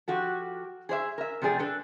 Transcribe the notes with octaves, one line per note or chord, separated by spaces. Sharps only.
F3 F#4 G4 A4
G#4 C5 D5 E5
A#4 E5
C3 F3 A3 G#4 D5 G5
D4 A4 B4